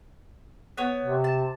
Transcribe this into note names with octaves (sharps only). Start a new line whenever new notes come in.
B3 C#5
C3
A5